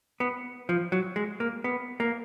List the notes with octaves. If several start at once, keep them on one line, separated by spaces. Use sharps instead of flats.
B3
F3
F#3
G#3
A#3
B3
A#3